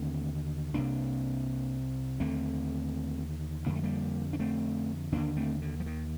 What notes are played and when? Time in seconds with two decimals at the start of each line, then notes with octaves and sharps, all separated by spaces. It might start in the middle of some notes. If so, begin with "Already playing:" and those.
Already playing: D#2 D3 A3 C4
0.74 C2 C3 A#3 D4
2.20 D#2 D3 A3 C4
3.66 F2 D3 A#3
3.75 A3
3.84 G3 A#3
4.33 D4
4.40 A3 C4
5.12 D#2 D3 A#3 D4
5.37 A3 C4
5.62 D3
5.80 F3
5.86 D#3